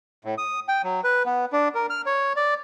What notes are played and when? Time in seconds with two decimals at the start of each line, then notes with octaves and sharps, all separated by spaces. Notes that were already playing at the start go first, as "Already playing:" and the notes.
0.25 A2
0.38 D#6
0.69 G5
0.84 F#3
1.04 B4
1.26 B3
1.53 D4
1.75 A#4
1.90 F6
2.06 C#5
2.36 D5